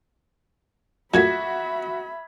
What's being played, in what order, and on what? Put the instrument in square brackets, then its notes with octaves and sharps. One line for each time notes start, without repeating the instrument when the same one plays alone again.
[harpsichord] F#2 A#2 A3 [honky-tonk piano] F#4 [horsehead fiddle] E5 B5 [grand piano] G#6 B6